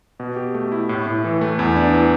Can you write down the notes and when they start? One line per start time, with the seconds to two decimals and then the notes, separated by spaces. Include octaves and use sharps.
0.20 B2
0.36 G4
0.55 A3
0.72 E4
0.89 A2
1.07 A2
1.24 E3
1.41 A3
1.59 E2
1.76 D4
1.93 E3